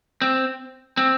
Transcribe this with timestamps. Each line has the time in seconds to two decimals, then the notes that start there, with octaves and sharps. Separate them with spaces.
0.22 C4
0.97 C4